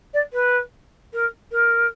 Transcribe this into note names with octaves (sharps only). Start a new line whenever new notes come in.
D5
B4
A#4
A#4